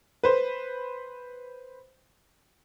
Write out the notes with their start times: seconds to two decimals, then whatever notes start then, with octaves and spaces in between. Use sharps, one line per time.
0.23 B4 C5